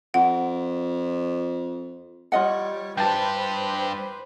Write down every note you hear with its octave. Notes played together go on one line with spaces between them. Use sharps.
F2 F#5
G3 F4 C#5 D#5 F#5
G2 G4 B4 C5 G5 A5